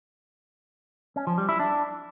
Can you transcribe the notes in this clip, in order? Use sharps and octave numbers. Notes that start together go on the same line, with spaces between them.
C#4
F3
G3
E4
D4